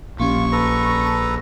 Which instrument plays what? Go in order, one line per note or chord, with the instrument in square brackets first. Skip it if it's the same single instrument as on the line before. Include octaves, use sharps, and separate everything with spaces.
[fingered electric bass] A#1 [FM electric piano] A#3 C#4 G4 [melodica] F4 [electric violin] C#6
[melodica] A4 B4 A#5
[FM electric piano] A5